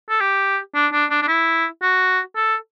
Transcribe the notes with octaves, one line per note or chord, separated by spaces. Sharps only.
A4
G4
D4
D4
D4
D4
E4
F#4
A4